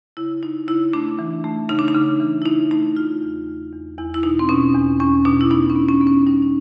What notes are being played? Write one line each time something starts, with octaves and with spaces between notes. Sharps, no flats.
C#3 E4
C#3 D#4
C#3 E4
A3 D4
E3
A3
C#3 D#4
D4
D#4
C#3
E3
E4
C#3 D#4
A3 D#4
C#3 F4
E2
E2
E2
E2 E4
E4
B2 D#4
C4
B2 C#4
E2
E2 C#4
B2 D4
E4
B3 D#4
C#4
B3
C#4
B3
C#4
G3 D#4
D#4